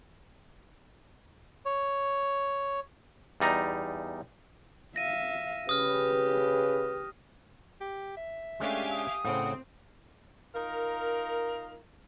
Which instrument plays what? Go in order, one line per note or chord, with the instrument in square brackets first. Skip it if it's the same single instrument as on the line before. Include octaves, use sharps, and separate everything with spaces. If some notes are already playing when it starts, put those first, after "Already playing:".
[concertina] C#5
[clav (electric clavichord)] E2 G3 D#4 A#5
[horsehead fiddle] E5 F5 [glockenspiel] A#6 D#7
[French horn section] C#3 B4 [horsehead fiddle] G4 [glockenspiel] D#6 F6
[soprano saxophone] G4
E5
[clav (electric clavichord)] G#3 C#4 D4 [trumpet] A3 [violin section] G4 F5 G#5
[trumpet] D#6
[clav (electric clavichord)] A2 C#3 [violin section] C4 [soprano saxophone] F#5
[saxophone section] D#4 F4 A#4